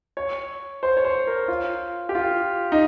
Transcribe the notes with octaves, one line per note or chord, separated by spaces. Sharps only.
C#5
C5
C#5
C5
A#4
F4
G4
F4
D#4